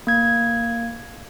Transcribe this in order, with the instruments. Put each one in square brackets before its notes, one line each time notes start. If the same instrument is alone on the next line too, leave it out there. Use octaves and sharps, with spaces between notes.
[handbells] A#3 G#6